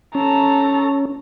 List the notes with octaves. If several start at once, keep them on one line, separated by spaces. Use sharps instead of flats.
C#4 A4 A#5